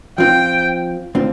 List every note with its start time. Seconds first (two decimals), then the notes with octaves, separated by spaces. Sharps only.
0.18 F3 C4 F4 G5
1.15 D3 A3 C4 F4